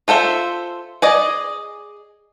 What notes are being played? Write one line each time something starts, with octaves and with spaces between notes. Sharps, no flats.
F4 A4 C5 E5
G#4 D5 D#5